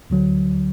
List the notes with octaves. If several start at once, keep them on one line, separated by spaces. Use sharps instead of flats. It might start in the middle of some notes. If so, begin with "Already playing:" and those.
D2 D3 F#3